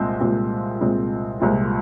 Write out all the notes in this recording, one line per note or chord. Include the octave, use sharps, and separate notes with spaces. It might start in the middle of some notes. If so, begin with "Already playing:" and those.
Already playing: C2 A#2 G#3 C4
C2 A#2 G#3 C4 F4
C2 A#2 G#3 C4 F4
C2 A#2 G#3 C4 F4